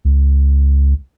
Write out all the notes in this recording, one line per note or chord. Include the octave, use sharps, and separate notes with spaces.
C#2